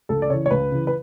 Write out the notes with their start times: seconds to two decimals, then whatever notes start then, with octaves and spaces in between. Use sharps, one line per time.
0.09 C#2 A4
0.22 D5
0.30 C#3 E3 C#5
0.46 C#5
0.51 C#2 B4
0.72 C#3 E3
0.87 B4